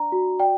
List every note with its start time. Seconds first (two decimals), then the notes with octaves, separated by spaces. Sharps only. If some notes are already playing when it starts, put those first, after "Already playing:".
Already playing: D4 D5 A#5
0.12 F#4
0.39 D5 G5